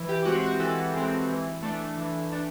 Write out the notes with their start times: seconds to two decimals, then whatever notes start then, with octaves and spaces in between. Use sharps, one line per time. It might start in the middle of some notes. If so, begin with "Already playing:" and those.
Already playing: E3
0.09 G4
0.25 G#3 C4 F#4
0.44 F#4
0.60 E3 A4
0.94 G#3 C4
1.29 E3
1.63 A3 D4
1.98 E3
2.32 A3 D4